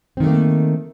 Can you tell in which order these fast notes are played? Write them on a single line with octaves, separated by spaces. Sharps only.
C4 D#3 A3 A#3